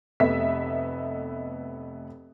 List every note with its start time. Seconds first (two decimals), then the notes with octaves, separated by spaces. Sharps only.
0.20 F1 A3 B3 D#5 E5 B6